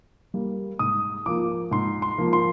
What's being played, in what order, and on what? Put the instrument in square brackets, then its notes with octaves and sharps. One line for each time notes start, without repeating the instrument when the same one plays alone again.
[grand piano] G3 A#3
G#2 D#6
F3 A#3 D6
G#2 C6
C6
F3 A#3
C6